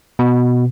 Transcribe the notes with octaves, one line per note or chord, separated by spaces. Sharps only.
B2